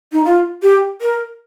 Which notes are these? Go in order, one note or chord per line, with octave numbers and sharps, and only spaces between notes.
D#4
F4
G4
A#4